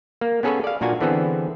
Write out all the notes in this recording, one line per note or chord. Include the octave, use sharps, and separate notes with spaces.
A#3
B3 C#4 G#4 A4 B4 C#5
D5 F5
A#2 A#3 D4 F#4 G#5
D3 E3 B3 C4 G#4 A4